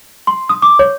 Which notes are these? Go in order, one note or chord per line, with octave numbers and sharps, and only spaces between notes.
C6
D#6
D6
C#5